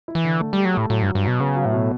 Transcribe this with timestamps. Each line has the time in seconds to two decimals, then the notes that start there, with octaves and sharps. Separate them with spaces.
0.08 E4
0.15 E3
0.24 D3
0.40 A3
0.53 G3 G4
0.65 F#3
0.74 A2 A3
0.90 A2 F#3
1.03 G2
1.07 F#3
1.15 G2
1.24 B2 F#3
1.40 C#3 B3
1.56 F#3
1.66 A2
1.73 B2